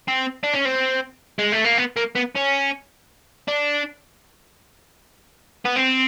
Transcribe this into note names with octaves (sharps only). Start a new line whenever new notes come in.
C4
D4
C#4
C4
G#3
A3
A#3
B3
A#3
B3
C#4
D4
B3
C4